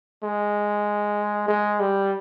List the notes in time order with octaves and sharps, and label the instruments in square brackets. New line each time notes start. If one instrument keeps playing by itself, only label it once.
[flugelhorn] G#3
G#3
G3